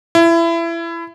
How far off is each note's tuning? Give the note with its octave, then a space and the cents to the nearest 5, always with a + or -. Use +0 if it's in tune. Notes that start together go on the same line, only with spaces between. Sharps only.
E4 +25